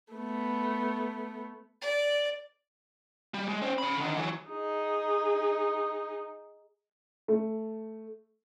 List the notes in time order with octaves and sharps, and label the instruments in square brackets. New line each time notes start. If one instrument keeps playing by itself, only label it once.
[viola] A3 B3
[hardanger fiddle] D5
[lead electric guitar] G3
G#3
C#4 C5
C#4 B5
D3 D#3
E3 F#3
[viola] D#4 G#4
[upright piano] A3